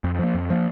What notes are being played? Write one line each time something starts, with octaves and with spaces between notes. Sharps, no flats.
F2
F3 A#3
F2
F3 A#3